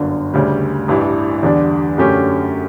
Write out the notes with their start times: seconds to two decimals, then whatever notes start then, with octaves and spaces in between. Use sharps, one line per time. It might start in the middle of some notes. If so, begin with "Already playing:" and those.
Already playing: G1 F#2 D3
0.34 D2 C#3 G3
0.88 A1 G2 E3
1.43 E2 D3 G3 D4
1.98 F#2 D3 A3 C#4 G4